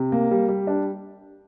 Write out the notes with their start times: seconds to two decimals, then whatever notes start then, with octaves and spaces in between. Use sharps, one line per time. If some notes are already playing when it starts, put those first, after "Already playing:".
Already playing: C3
0.12 A#3
0.31 G3
0.48 G3
0.67 D4